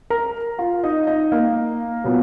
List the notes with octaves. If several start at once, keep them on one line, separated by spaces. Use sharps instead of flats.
A#4 A#5
F4 F5
D#4 D#5
D#4 D#5
A#3 A#4
A#2 F#3 B3